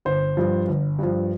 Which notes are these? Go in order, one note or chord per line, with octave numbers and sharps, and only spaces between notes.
G1 C5
G2 F3
G1
G2 F3